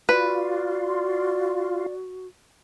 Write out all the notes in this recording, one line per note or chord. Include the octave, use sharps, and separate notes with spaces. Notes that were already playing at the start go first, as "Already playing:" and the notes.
F4 F#4 B4 D5